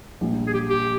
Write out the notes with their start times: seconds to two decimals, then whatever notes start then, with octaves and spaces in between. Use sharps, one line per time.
0.21 A#1 A#2 G3
0.47 G#4
0.53 G4
0.70 G4